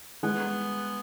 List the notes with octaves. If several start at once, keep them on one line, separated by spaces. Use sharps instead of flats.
G#3 B3